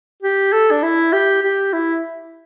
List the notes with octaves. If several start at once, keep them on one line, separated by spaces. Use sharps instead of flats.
G4
A4
D4
E4
G4
G4
E4